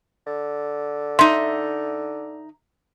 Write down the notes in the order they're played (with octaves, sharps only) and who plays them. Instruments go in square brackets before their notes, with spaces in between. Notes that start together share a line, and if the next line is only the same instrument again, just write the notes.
[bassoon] D3
[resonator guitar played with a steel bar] D#4 E5 [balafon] C6